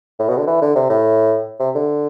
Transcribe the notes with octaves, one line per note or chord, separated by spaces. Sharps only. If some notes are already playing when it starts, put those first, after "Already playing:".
A2
B2
D3
E3
D3
C3
A2
C3
D3